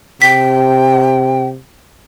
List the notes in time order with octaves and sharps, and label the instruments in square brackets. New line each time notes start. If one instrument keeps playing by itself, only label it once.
[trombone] C3 [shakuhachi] G5 [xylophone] B6